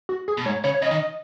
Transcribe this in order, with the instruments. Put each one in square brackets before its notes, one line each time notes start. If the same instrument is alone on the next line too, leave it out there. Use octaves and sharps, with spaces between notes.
[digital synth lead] F#4
G#4
[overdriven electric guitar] B2
[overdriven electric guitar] G#2 [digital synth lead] C#5
[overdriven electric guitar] C#3 [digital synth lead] C#5
[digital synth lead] C#5
[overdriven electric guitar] C#3 [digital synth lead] D#5
[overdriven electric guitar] D#3